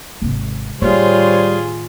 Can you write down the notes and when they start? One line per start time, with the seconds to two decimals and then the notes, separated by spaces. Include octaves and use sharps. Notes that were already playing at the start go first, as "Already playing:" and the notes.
0.22 G#1 C3
0.81 A2 D#3 G3 F4 G#4 C5 C#5